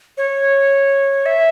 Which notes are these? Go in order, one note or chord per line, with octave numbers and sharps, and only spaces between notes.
C#5
E5